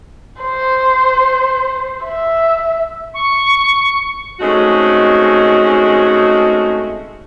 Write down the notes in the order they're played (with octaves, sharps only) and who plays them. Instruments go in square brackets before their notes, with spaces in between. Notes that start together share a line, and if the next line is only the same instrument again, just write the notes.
[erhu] C5
E5
[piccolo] C#6
[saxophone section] G#3 A3 C4 C#4 D#4 F#4